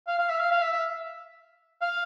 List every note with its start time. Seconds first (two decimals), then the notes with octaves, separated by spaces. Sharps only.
0.07 F5
0.18 F5
0.29 E5
0.39 F5
0.51 F5
0.62 E5
0.72 E5
1.81 F5